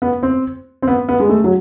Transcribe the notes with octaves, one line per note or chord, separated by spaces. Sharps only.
B3
C4
C4
B3
B3
G#3
A3
F#3